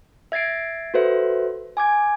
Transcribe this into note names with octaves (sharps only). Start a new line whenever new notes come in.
E5 G#6 A6 C7 D7
F#4 A4 B4 C5 E5
G#5 D6 G#6